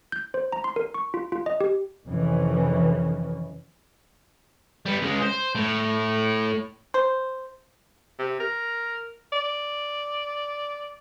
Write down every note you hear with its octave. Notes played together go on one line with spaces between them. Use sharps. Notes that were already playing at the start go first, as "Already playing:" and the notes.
G6
C5
A#5
C6
A#4
C#6
F4
F4
D#5
G4
F2 C3 D#3 E3 C#4
G3 B3
C#2 G#3
C5
A2
C5
C3
A#4
D5